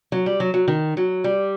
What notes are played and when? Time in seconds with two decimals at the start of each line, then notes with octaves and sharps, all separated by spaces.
0.12 F#3
0.26 G3
0.40 F#3
0.54 F#3
0.68 D#3
0.97 F#3
1.24 G3